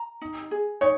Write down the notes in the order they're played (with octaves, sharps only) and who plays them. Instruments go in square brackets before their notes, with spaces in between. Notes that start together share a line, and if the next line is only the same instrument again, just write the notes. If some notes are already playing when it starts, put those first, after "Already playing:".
Already playing: [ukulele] A#5
D#4
G#4
[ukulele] D#4 [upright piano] C#5